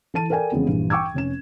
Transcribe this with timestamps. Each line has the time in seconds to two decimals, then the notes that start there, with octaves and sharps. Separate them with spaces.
0.14 E3 A4 A5 D#7
0.30 A4 A#4 D5 G5 G#5
0.52 F2 C#3 E3 G#3 B3
0.67 A#1 G2 E3
0.90 G5 C#6 D6 E6 G#6
1.14 F1 C#4 E7